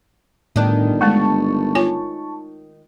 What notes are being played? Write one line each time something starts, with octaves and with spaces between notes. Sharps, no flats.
G1 A2 D#3 D4
G#3 A3 A5 C#6
F4 C#5 G#5